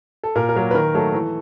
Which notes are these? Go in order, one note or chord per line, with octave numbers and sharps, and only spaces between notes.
A4
A#2 A#4
A#4
F#3 A#3
B4
D#3 A#4
F#3 A3 A4
E3